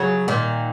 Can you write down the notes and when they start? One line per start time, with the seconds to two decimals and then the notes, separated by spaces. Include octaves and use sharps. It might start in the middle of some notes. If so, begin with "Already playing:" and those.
Already playing: C#3 F#3
0.28 A#2 D#3